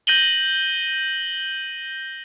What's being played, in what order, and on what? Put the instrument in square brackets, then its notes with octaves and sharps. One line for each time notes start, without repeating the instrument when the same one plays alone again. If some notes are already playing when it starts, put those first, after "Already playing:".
[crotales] G6 A#6 D#7 F#7 G7